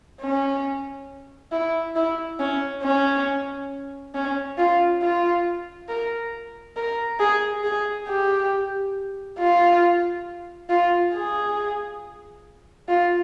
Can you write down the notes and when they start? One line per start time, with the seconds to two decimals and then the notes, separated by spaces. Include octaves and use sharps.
0.21 C#4
1.52 E4
1.96 E4
2.40 C#4
2.83 C#4
4.14 C#4
4.58 F4
5.02 F4
5.89 A#4
6.77 A#4
7.20 G#4
7.64 G#4
8.08 G4
9.39 F4
10.69 F4
11.14 G#4
12.89 F4